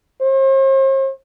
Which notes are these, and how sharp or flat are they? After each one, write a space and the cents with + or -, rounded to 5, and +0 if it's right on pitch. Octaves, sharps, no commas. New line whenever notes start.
C5 +45